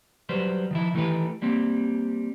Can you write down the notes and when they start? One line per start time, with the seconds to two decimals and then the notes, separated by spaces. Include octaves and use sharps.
0.29 F#3 G3 B4 C5
0.71 D#3 F3 E4
0.94 D#3 E3 A3 E4 G4 B4
1.42 G3 A#3 C4 G4